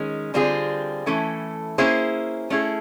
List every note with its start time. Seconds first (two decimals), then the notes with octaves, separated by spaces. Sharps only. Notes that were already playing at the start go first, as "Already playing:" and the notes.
Already playing: D#3 G#3 C#4
0.34 D3 G3 C4 F4 G#4
1.06 E3 A3 C#4 E4 A4
1.78 A#3 C#4 E4 G#4 C5
2.50 A3 C#4 E4 G#4